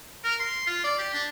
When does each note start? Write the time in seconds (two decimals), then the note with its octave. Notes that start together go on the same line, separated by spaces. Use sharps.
0.24 A#4
0.40 C6
0.67 F4
0.84 D5
0.99 G4
1.13 D4